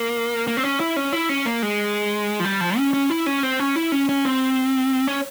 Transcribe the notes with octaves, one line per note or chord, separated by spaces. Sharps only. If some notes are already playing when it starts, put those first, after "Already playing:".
Already playing: A#3
A#3
C4
C#4
E4
C#4
E4
C#4
A#3
G#3
F3
G3
F3
C#4
C#4
E4
C#4
C4
C#4
E4
C#4
C#4
C4
C#4